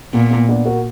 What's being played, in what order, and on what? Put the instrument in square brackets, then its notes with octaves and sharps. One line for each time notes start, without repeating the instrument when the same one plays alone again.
[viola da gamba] A#2 [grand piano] B3
[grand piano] B3
B3 D4
F#4 A#4